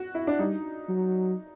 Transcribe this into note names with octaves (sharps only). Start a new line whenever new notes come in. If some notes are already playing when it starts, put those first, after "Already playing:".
Already playing: F#4
E4
D4
G3 D#4
F#3